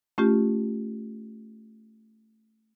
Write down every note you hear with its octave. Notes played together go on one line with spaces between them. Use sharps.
A3 C#4 F4 G4